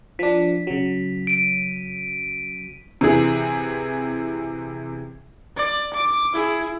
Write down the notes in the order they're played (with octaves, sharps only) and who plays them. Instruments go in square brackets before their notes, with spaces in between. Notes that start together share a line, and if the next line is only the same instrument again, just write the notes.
[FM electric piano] F3 D4 [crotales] B6
[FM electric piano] C#3 F#3
[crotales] D7 D#7
[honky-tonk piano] C3 E3 G#4
[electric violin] D5
D6
E4 G#4